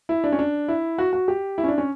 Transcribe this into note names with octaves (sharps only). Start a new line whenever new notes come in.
E4
D4
C#4
D4
E4
F#4
F#4
G4
E4
C#4
D4
C#4